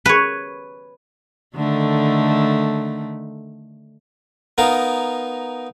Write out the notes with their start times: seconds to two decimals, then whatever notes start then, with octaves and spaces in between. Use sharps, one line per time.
0.06 B4 C#5
1.56 D3 D#3 A3
4.58 B3 D#4 A#4 F5